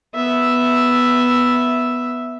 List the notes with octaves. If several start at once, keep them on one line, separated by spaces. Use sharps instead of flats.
B3 E5